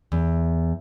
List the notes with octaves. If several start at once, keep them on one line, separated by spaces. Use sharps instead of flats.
E2